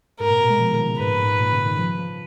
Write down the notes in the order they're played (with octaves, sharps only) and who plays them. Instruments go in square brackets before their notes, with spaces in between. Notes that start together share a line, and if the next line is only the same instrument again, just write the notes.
[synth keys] G#2 [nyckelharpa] A#4
[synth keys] A#2
B2
G#3
F3
D#3
F3
C#3
[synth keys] G#2 [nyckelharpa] B4
[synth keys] A#2
G#2
A#2
C#3
D#3
F3
F3